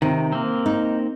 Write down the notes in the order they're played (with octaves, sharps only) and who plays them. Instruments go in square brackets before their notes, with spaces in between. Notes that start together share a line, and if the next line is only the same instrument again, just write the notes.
[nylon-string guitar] C3 [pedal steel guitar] D#3
[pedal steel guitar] A#3 C4
[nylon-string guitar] D#4